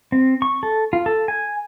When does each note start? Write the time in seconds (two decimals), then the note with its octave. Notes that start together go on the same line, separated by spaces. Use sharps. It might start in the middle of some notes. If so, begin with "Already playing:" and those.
0.12 C4
0.42 C#6
0.63 A4
0.93 F4
1.06 A4
1.28 G#5